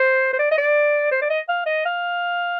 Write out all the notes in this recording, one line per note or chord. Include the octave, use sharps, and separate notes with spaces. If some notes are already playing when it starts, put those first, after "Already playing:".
Already playing: C5
C5
D5
D#5
D5
C5
D5
D#5
F5
D#5
F5